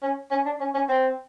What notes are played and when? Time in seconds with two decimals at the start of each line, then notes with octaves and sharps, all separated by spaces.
0.02 C#4
0.31 C#4
0.45 D4
0.60 C#4
0.74 C#4
0.89 C4